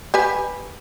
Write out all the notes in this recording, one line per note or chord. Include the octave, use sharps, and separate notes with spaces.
G4 B4 G#5